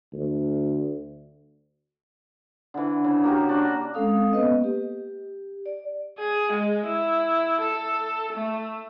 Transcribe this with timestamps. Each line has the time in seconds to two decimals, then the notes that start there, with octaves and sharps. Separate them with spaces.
0.13 D2
2.74 D3 E3
3.04 C#3
3.24 A#3 F#4 G4
3.49 D4 F#4
3.94 G#3 C4 C#4 A4 F5 D#6
4.33 A#3 B3 B4 D#5
4.64 G4
5.66 D5
6.19 G#4
6.52 G#3
6.85 E4
7.61 A4
8.33 A3